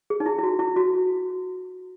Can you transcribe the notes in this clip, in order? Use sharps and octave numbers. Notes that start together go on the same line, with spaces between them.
G#4
D#4
E4
E4
F#4
E4
F#4